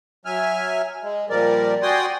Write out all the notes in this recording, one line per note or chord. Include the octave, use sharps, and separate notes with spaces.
F#3 E5 G#5 F6
G#3
A#2 F3 G3 A#4 D5
F#4 D5 G5 G#5 C6 D#6